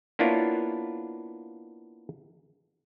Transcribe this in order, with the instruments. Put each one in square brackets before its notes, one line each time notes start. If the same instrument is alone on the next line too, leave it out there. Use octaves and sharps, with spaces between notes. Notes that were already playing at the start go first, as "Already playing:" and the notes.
[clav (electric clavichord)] A#3 B3 D4 E4 F4 C#5